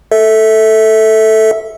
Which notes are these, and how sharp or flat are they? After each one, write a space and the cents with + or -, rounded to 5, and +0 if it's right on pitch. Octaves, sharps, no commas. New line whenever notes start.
A4 +0 E5 -15